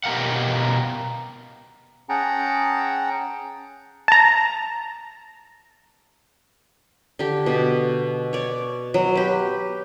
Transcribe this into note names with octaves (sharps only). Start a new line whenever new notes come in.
B2 G4 A#4 F5 F#5
C#4 G#4 F#5 G5 A5 A#5
A5 A#5
D3 G4
B2
C#5 D5
F#3
G4 B4